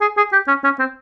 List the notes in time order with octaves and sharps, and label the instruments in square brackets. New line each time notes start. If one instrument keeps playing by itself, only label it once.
[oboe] G#4
G#4
G4
C#4
C#4
C4